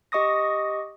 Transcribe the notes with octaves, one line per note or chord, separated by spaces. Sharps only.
G4 D#5 C#6 D#6 A#6